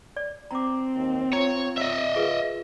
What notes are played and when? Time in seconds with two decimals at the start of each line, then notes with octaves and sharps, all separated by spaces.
0.17 D5
0.51 C4 A#5 D6
0.95 D#2
1.33 F4 C#5 A#5
1.77 D#5 E5
2.16 F4 G#4 A#4 B4